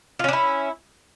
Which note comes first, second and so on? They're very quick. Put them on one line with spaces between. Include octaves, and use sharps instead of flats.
F4 C#4 D4 E4